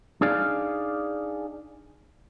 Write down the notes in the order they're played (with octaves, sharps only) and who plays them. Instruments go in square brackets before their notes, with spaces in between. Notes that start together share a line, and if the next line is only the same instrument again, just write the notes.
[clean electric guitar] D4 D#4 G#4 D5 F5